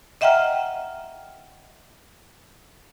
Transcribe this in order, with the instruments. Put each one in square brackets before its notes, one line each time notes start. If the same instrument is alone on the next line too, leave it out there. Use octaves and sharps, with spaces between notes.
[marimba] D#5 E5 F#5 G5 A#5 F6